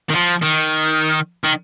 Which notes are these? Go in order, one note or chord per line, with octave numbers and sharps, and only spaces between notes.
D#3
F3
D#3
D#3